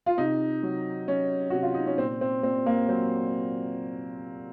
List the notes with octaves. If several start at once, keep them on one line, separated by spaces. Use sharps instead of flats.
F4
C3 D#4
F#3
F#3 C#4
C3 F#4
F4
D#4
C#4
A#2 C4
C4
A#2 C4
A#3
F#3 C4